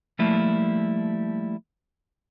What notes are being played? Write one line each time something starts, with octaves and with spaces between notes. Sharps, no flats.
F3 G3 A3 A#3 E4